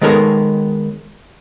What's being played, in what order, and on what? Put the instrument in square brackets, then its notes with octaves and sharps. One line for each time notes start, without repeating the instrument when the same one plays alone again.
[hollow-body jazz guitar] D#3 G#3 B3 A4 A#4 C#5